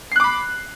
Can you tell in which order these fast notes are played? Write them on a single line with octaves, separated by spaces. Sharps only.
C7 F#6 D6 B5